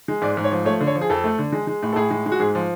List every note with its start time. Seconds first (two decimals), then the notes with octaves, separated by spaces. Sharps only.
0.08 G#3
0.22 G#2 D5
0.37 G#2
0.44 C#5
0.52 F3
0.66 A3 C#5
0.80 D3
0.87 C#5
0.95 F3
1.01 G#4
1.10 F2 A4
1.24 A3
1.38 D3
1.52 G#3
1.67 G#3
1.83 A2
1.93 A4
1.96 A2 G#4
2.11 G#3
2.26 G#3
2.32 F#4
2.40 G#2 G#4
2.55 F3